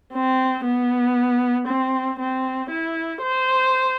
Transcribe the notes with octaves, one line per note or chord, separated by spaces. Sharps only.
C4
B3
C4
C4
E4
C5